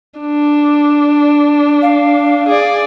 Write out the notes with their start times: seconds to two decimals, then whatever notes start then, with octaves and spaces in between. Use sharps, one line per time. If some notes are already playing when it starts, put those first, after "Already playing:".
0.21 D4
1.82 F5
2.49 G#4 D5